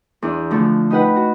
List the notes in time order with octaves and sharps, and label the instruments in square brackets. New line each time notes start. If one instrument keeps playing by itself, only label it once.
[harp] E2 D4
D3 F3 A3
D#4 G4 B4 F#5
F#4